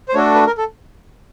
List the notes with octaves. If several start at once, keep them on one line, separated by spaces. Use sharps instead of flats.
C5
A3 D4 F#4 A4 C#5
B4
A#4
A4